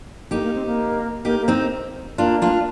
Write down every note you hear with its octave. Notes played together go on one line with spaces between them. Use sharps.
A#3 D#4 G4
A#3
C4
A#3
A#3 D#4 G4
A#3
C4 D#4
A#3 D4 F4
D4 F4